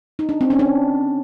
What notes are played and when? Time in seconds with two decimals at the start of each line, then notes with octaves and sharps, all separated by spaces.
0.19 D#4
0.29 D4
0.41 C4
0.50 C#4
0.59 D4